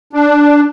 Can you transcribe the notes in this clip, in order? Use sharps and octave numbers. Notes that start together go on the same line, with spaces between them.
D4